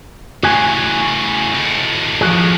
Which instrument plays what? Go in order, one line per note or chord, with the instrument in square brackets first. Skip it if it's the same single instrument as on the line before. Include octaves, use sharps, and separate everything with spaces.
[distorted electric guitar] A2 C#3 [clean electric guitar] F#4 G#5
[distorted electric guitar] D#2 A2
[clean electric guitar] F3 F#4 G#4